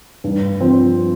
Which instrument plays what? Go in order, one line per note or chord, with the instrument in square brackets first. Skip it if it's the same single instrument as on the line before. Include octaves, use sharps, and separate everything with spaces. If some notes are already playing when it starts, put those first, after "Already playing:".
[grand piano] G2
F3 C4